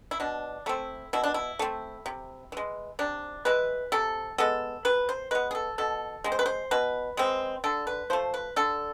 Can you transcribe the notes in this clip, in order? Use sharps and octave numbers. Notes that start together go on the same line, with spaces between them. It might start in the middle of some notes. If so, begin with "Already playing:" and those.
E4
B2 D4
A3 C4 E4
B2 E4
D4
E4
A3 C4
C3
E3 G#3
C3 D4
E3 G#3 B4
C3 A4
G#3 B3 A4
C3 B4
C5
G#3 B3 B4
G#4
A4
B2 A4
G#3 C4
C5
B4
C5
B2 B4
G#3 C4
D3 A4
B4
F3 A3 C5
B4
D3 A4